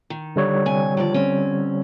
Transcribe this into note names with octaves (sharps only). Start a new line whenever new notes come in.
D#3
D3 G3 C#5
C3 G#5
D#3 F3 D5
C4 C#4